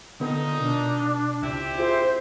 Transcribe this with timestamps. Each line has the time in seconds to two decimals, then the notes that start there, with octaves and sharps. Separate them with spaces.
0.20 A#2 D3 D#3 B3 D#4 A4
0.60 B2 D4
1.43 C#2 C4 E4 G4
1.78 F4 G#4 C5 E5